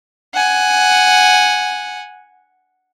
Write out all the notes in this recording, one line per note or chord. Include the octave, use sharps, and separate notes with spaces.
F#5 G#5